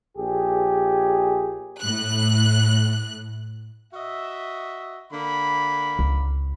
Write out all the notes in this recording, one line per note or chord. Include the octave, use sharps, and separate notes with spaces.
A#1 G4 G#4
A2 F#6
F#4 D#5 E5
D3 A#3 B5
C#2